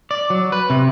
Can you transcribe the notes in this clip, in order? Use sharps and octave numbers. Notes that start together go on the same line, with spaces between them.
D5
F#3
B4
C3